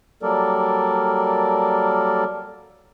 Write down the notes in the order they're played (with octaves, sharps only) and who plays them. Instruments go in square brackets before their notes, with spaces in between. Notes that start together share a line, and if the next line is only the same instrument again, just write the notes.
[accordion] F#3 G3 A#3 A4 A#4 D5